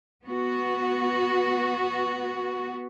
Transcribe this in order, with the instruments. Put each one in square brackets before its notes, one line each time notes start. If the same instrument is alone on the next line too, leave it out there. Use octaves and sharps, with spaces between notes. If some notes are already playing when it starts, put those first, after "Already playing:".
[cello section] B3 F#4